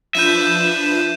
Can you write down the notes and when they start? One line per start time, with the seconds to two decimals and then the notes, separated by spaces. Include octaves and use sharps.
0.15 F3 D4 B4 E5 G6 D#7 E7